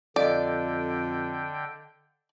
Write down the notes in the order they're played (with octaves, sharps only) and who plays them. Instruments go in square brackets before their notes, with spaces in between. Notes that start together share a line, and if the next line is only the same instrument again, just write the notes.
[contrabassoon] F2 [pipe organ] D3 G5 [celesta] A4 D#5 F5 [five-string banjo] D5